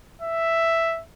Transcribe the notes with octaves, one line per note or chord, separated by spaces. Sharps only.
E5